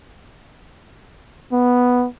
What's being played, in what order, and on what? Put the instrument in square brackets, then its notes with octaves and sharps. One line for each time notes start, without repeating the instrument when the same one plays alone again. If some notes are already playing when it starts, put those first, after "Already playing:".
[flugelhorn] B3